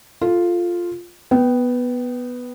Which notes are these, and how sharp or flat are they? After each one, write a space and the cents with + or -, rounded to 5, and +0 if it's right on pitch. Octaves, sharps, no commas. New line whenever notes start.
F4 +0 A4 +0
B3 +0 G5 -20